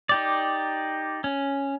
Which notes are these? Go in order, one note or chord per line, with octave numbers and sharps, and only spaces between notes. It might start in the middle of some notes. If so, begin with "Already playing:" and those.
D#4 G4 D5
C#4